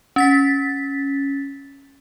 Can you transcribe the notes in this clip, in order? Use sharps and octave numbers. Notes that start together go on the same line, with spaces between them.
C#4 A6 B6